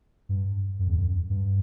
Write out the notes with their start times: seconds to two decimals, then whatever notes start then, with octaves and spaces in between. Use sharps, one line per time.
0.29 G2
0.79 F#2
0.88 E2
0.97 F#2
1.30 G2